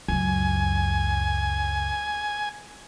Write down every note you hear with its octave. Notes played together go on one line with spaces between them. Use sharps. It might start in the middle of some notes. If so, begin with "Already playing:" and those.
C#2 F#2 G#5